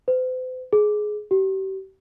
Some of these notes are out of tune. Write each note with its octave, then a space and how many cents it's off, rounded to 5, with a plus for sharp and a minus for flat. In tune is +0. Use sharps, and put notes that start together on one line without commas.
C5 -45
G#4 +15
G4 -35